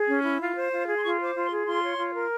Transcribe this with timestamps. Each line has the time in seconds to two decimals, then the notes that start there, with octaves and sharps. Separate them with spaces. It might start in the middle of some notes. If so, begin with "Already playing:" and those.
Already playing: G#4
0.08 C#4
0.24 E4
0.40 F4
0.55 C5
0.71 F4
0.87 G#4
0.97 C6
1.03 F4 C#6
1.19 C5 D6
1.35 F4
1.46 C6
1.51 G#4
1.66 F4 C6
1.82 C#5
1.98 F4
2.14 A#4